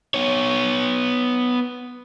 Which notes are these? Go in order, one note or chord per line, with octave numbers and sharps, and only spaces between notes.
B3 C#5